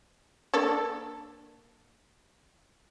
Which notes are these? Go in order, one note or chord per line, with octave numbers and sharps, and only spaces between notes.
A#3 D4 A4